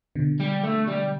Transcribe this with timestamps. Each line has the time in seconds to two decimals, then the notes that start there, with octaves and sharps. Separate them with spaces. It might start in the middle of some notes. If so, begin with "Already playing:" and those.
0.15 B2 D3
0.40 G3
0.64 A3
0.88 G3